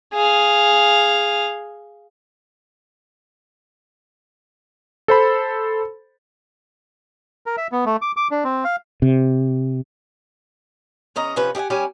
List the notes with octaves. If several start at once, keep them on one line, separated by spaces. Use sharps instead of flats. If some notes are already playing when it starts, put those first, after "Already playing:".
G#4 F5
A4 C5 B5
A#4
E5
B3
A3
D6
D6
D4
C4
F5
C3
E2 C#4 D#5 A#5
C3 F3 C#4 B4
G4 G#4 D#5 F#5 G#5
G3 C#4 G4 G#5